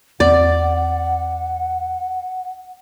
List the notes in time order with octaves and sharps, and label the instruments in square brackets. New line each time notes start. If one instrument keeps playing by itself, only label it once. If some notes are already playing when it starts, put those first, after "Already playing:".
[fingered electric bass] E2 C4 [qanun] D5 [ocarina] F#5